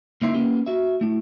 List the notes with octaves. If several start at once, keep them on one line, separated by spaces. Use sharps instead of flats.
C#3 A#3 D#4 E4 E5 C6
A#3 B3 C#4 G4
F#4 E5
A3 E4